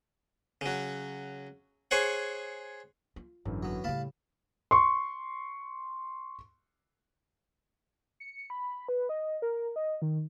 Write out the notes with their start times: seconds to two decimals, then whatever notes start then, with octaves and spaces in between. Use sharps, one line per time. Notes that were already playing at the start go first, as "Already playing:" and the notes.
0.61 C#3 F#3
1.91 G#4 C5 C#5 F#5
3.16 F4
3.45 G#1 F#2 D3 E3
3.63 F#3 B3
3.84 A2 C#3 E3 G3 F5 A5 B5
4.71 C6 C#6
8.20 C#7
8.50 B5
8.89 B4
9.09 D#5
9.42 A#4
9.76 D#5
10.02 D#3